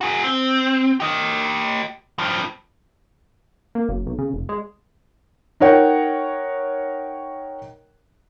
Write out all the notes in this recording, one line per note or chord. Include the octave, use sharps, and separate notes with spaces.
F#4 G#4
C4
G4 D#5
G2 F3
A#3
F#1
B1
C#3
F1
G#3
D#4 A#4 C#5 F#5 G5